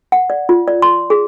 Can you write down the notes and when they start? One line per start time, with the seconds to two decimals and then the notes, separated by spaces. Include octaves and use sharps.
0.12 F#5
0.30 D5
0.49 F4
0.68 D5
0.82 C6
1.10 G#4